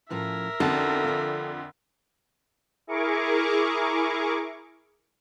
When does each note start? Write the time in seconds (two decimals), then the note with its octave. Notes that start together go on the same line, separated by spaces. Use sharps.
0.10 A2 F3 C#4 A#4 E5
0.60 F2 D3 C#4 D#4 F#4 A4
1.04 F4 D5
2.87 E4 G#4 A#4 C#6 D6